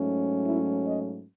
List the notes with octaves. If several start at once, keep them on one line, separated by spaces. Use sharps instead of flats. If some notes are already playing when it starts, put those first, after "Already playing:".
Already playing: G#2 F#3 A3 C#4
E4
D#5